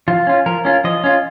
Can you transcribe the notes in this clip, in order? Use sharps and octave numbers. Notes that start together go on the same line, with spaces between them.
F3 F4
C#4 F4
F3 A#4
C#4 F4
F3 D#5
C#4 F4